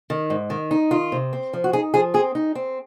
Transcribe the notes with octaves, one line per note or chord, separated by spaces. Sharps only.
D#3
G#2
D#3
D#4
D#3 F4
C3
C4
F3
F#4
D#4 G#4
F3 G#4
C4 G#4
D#4
C4